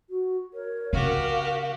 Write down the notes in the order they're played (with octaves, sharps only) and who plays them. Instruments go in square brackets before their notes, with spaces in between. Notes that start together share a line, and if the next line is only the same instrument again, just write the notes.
[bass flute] F#4
[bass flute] A#4 [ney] C#5
[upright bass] C#3 [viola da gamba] F#4 G4 [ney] F5